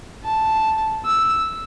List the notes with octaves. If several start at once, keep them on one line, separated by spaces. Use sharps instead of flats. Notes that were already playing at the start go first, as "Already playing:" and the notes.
A5
E6